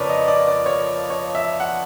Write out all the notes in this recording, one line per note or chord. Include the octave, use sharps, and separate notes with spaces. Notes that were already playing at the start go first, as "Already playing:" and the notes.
Already playing: F2 C#3 F3 A#4 B4 C#5 D5
D#5
D5
D5
C#5
C#5
E5
F#5